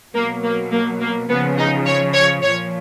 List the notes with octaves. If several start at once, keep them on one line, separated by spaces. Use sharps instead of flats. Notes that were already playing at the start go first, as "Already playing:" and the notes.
B2 F#3 A#3
A#3
A#3
A#3
C#3 F3 B3
D#4
C#5
C#5
A#2 F3 C#5